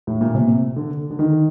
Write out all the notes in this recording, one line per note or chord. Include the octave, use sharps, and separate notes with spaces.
A2
A#2
C3
D3
D3
D#3